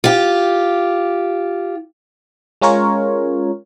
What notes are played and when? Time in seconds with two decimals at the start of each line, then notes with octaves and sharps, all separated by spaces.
0.04 F4 G4
2.62 G#3 C#4 F4 A#4 C#5